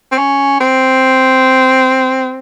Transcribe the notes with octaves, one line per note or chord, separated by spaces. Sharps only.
C4
C#4
C4